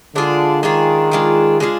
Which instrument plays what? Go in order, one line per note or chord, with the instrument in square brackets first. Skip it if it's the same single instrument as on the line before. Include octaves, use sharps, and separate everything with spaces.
[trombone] D3 [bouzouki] G#3 D4 F4 G#4
[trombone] D#3 [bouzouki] G#3 D4 F4 G#4
[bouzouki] G#3 D4 F4 G#4
G#3 D4 F4 G#4